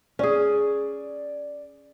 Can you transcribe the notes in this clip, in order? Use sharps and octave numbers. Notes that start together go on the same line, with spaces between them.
C#4 G#4 D5